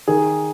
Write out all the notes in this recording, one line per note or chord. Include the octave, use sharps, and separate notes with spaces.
D#3 G#4